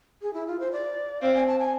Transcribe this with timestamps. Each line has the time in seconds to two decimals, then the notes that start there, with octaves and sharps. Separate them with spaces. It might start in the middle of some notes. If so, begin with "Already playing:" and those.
0.22 G#4
0.34 E4
0.47 F4
0.60 C5
0.72 D5
1.22 C4 F5
1.34 G#5
1.47 A5
1.59 G#5